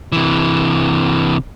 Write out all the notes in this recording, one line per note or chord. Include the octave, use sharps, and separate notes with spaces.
C3 E3